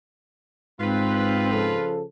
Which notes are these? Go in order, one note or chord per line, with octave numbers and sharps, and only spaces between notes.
G#2 C4 F4 B4
C#3 F3 A4